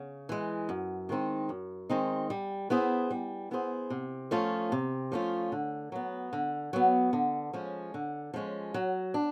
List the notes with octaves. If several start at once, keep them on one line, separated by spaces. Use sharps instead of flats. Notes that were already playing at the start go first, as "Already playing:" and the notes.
Already playing: C#3
E3 G#3
F#2
D#3 G#3 C4 D#4
F#2
D#3 G#3 C4 D#4
G3
B3 E4 G#4 C5
G3
B3 E4 G#4 C5
C3
F3 A3 C#4 F4
C3
F3 A3 C#4 F4
D3
F#3 B3
D3
F#3 B3
D3
F3 G#3 C#4
D3
F3 G#3 C#4
F#3
D4